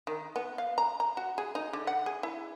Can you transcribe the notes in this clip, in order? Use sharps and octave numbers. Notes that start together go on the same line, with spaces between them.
D#3
B3
F5
A#5
A#5
F#4
G#4
D#4
D3
F#5
G#4
E4